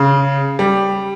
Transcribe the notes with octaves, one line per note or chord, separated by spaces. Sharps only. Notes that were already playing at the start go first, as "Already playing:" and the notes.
Already playing: C#3
G3